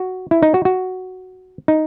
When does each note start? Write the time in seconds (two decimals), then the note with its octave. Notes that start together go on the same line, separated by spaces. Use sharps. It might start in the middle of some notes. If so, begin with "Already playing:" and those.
Already playing: F#4
0.31 E4
0.43 D#4
0.54 F#4
0.65 F#4
1.68 D#4